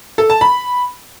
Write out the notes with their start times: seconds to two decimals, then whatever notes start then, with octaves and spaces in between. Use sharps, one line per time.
0.18 A4
0.30 A5
0.41 B5